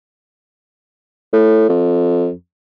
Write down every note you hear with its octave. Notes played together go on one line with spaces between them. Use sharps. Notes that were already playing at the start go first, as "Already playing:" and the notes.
A2
F2